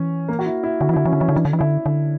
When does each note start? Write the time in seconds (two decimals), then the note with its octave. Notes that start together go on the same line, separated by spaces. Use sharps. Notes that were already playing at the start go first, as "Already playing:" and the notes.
Already playing: E3 C#4
0.28 A#3
0.39 F#4
0.46 E4
0.63 E4
0.81 D3 F#4
0.89 E3
0.93 E4
0.96 D3
1.05 E3 C#4
1.13 D3
1.20 E3 C#4
1.29 D3
1.33 D4
1.36 E3
1.45 D3
1.53 E3
1.59 D3 E4
1.86 D3